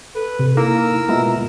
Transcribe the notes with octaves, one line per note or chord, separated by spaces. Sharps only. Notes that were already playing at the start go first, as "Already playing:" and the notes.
A4 B4
C3
A#3 D#4 E4 A#4 E6
B2 G#3 F4 E5 A#5